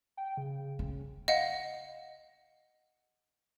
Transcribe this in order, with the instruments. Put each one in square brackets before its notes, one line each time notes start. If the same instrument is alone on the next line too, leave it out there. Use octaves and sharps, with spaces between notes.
[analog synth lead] G5
C#3
[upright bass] C#4
[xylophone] D#5 F5 F#5